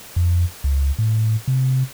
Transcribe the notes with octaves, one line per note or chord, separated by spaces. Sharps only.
F2
C#2
A2
C3